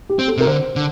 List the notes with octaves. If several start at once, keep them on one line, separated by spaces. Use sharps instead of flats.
G4
C4
A4
C3 A#4
D3 C5
D3